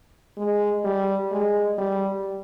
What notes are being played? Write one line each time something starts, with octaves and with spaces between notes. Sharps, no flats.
G#3
G3
G#3
G3